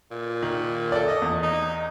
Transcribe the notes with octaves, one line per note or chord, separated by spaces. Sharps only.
A#2
D#3
A4 D5
D#5
E2
D#4